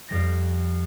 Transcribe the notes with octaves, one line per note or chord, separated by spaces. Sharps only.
F2 G3 A#6